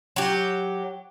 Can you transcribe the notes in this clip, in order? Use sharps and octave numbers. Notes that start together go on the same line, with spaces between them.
F#3 G4